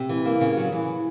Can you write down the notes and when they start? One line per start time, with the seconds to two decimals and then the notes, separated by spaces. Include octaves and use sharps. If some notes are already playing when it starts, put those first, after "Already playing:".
Already playing: C3
0.09 E3
0.25 A#3
0.41 C#3
0.57 F#3
0.72 E3